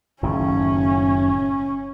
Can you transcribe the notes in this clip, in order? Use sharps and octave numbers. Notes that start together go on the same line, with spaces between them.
F#1 A2 D#3 C#4